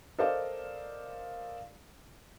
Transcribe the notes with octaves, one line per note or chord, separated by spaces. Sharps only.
A4 A#4 C5 D5 D#5 F5